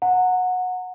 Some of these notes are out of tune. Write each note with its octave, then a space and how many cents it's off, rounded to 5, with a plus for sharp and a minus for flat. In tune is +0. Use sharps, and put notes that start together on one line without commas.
F#5 -20 A#5 -30